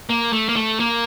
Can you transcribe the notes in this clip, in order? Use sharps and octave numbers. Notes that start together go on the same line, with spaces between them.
A#3
A3
A#3
A3
A#3